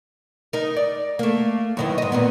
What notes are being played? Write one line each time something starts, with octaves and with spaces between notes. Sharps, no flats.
D#4 A#4
D5
A3 A#3
F#2 D#3 E3
G#2 D#5
A#2 A#3 B3